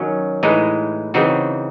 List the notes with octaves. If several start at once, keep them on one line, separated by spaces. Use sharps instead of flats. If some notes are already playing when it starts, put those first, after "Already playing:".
Already playing: D#3 F#3 C#4
A2 E3 G#3 D#4
C#3 E3 C4 D#4 F#4